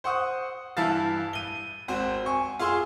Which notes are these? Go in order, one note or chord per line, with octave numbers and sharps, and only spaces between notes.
C5 F#5 C#6 D#6
G2 E3 E4 F5 A5 A6
D#7 G7
G#1 C4 F#4
G#5 C#6
F4 G#4 F5 C6 E6